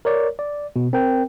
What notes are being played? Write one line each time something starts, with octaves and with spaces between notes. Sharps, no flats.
A#4 C#5 D5
D5
B2
C4 A#4 G5